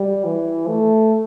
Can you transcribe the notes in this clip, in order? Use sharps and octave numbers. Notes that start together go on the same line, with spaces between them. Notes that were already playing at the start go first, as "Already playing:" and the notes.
Already playing: G3
E3
A3